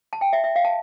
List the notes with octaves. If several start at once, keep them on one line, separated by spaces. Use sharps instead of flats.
A5
G5
E5
E5
F5
A5